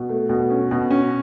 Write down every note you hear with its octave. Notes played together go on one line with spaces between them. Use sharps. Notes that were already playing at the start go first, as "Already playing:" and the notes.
Already playing: B2
A3
B2
C#4
B2
C#4